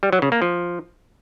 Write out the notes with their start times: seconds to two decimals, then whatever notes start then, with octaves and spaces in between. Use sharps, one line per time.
0.03 G3
0.13 F#3
0.22 C#3
0.32 A#3
0.42 F3